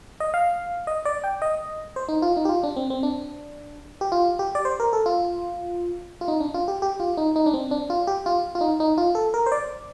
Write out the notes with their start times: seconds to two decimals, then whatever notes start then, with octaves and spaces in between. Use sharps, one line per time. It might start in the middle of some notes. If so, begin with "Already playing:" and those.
0.20 D#5
0.34 F5
0.87 D#5
1.05 D5
1.24 G5
1.42 D#5
1.96 C5
2.09 D#4
2.22 F4
2.37 D#4
2.45 G4
2.49 F4
2.63 D4
2.76 C4
2.90 C4
3.03 D4
4.01 G4
4.12 F4
4.39 G4
4.55 D5
4.65 C5
4.80 A#4
4.93 A4
5.06 F4
6.21 F4
6.28 D#4
6.40 D4
6.54 F4
6.68 G4
6.82 G4
7.00 F4
7.17 D#4
7.36 D#4
7.46 D4
7.54 C4
7.71 D4
7.90 F4
8.07 G4
8.26 F4
8.55 F4
8.61 D#4
8.80 D#4
8.98 F4
9.15 A4
9.34 A#4
9.46 C5
9.52 D5